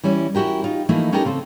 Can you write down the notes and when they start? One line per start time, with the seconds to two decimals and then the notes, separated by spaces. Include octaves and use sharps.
0.04 E3 G3 C#4 E4
0.35 C#4 E4 F#4 G4 A#4
0.64 D#4 F4
0.89 E3 F3 A3 A#3 D#4 E4
1.12 C#4 D#4 E4 G4 A4 A#4
1.25 C#3 C4 A4